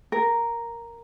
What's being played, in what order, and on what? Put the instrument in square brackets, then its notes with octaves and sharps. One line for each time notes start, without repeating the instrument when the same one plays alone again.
[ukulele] A#4